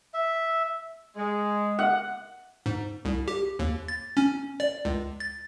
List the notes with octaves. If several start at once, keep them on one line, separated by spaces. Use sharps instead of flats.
E5
G#3
F#5
G#2
C2
G4
D#2
A6
C#4
D5
C#2
A6